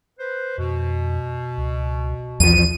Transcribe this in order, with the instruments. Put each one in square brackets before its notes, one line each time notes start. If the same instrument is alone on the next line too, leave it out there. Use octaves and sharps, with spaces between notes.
[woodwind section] B4 C5
[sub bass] F2 [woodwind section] B2
[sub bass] C#2
[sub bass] B1 [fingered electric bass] E2 F3 [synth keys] D#7